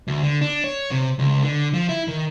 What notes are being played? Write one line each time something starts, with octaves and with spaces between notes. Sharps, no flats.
D2
D3
D4
C#5
C3
C#2
D3
F3
E4
D#3